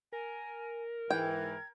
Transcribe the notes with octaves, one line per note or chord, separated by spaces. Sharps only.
A#4 G#5
G#2 E3 G5 G#6